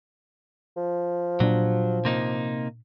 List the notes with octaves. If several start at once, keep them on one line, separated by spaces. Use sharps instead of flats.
F3
A#2 F#3 D4
C3 A#3 D#4